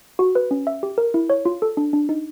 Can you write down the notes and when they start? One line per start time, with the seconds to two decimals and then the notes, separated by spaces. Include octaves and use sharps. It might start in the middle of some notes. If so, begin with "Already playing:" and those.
0.19 F#4
0.35 B4
0.51 C#4
0.67 E5
0.83 G4
0.98 A#4
1.14 E4
1.30 C#5
1.45 F4
1.62 A4
1.77 D4
1.93 D4
2.09 D#4